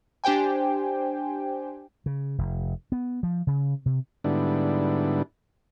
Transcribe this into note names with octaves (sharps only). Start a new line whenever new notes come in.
D4 G4 C5 G5 G#5
C#3
F1
B3
F3
C#3
C3
G#2 D3 G3 B3 D4 E4